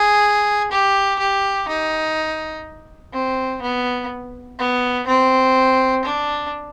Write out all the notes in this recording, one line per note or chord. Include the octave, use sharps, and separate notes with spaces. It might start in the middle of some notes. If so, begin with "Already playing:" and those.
Already playing: G#4
G4
G4
D#4
C4
B3
B3
C4
D4